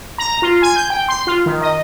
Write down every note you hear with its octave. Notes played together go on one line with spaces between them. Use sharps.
A#5
F4
G#5
G6
G5
C6
F4
D#3
D#5